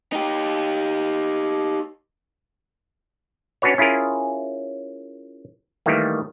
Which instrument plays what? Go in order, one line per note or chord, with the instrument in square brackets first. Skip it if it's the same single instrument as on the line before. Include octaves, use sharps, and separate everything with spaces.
[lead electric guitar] D#4 G4
[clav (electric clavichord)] C#4 D4 F#4 B4 C#5
C#4 E4 F4 G#4 A#4
D#3 E3 G3 A3 A#3